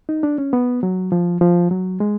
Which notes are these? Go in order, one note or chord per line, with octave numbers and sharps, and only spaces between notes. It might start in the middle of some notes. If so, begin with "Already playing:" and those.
D#4
D4
C#4
B3
F#3
F3
F3
F#3
G#3